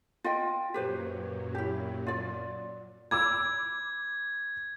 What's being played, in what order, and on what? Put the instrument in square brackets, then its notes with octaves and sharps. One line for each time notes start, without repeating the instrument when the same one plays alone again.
[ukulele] F4 D#5 G5
[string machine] F#2 A#2 F#3 [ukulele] G4 B4 C5
[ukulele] E4 G4
F4 D5
[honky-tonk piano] B5 D6 E6 [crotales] G#6